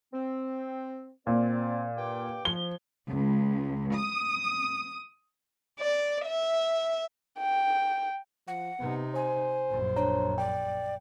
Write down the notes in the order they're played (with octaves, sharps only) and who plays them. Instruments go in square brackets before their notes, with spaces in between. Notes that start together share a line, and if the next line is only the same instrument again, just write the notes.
[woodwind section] C4
[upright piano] A#2 [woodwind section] C4 D5
[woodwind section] G2 G5 D6
[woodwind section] F3 [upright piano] G7
[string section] C#2
D#6
[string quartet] D5
E5
[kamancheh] G5
[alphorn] F3 [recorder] F#5
[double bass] C3 D#4 [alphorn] B3
[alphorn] C5 [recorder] G#5
[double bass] A#1 F#2
[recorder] D4 [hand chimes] C#5 A#5
[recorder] D5 [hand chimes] G5